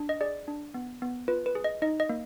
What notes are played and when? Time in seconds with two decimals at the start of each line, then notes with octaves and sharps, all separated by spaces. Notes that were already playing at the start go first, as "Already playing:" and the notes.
Already playing: D4
0.09 D#5
0.21 G#4 D5
0.48 D4
0.74 B3
1.02 B3
1.28 F4 B4
1.46 B4
1.55 G#4
1.64 D#5
1.82 D#4 D#5
2.00 D#5
2.09 A#3